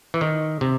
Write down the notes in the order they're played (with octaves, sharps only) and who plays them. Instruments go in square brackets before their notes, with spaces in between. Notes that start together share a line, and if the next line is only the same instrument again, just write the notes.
[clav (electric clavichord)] E3
D#3
C3